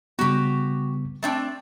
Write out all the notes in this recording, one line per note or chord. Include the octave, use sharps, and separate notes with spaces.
C#3 G3 B3 F#4 G4
A3 C4 D4